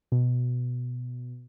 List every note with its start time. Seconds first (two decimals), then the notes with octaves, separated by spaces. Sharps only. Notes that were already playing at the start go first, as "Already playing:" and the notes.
0.12 B2